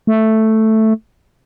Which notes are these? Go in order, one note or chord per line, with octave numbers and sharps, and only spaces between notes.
A3